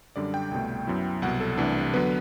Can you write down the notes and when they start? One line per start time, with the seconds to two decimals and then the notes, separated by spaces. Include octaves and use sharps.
0.16 F#2 D3 G3 D4 D5
0.34 G5
0.51 C2 B2 A3
0.87 F#2 F#3 B3 E4
1.22 C2 B2 F#3 F#5
1.40 A4
1.58 C2 C3 E3 A3 D4
1.94 D3 F#3 B3 B4